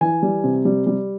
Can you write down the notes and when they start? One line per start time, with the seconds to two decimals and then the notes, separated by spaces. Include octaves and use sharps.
0.01 E3 G#5
0.22 G3
0.44 C3
0.65 G3
0.87 G3